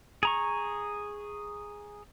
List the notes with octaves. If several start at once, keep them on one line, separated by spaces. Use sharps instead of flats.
G#4 A#5 C#6